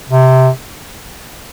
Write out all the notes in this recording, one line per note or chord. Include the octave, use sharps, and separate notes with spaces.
C3